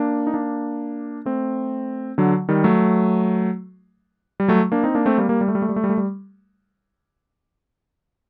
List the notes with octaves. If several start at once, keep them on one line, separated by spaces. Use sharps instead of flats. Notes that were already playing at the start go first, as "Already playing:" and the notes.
Already playing: A#3 D4
D#4
A#3 D4
A3 C4
D3 F#3
D#3 G3
F#3 A3
G3
F#3 A3
A#3 D4
C4 D#4
A#3 D4
A3 C4
G3 A#3
G3 A#3
G3
A3
G3
A3
G3
A3
G3
A3
G3